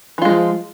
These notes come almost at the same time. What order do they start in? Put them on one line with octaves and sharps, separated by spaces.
E3 F4 G#3 F3